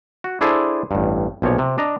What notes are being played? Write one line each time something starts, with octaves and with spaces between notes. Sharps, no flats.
F#4
D4 E4 G#4 A4 C5
A1 G2
B1 A#2 F3 C#5
C3
D4 D#5 A#5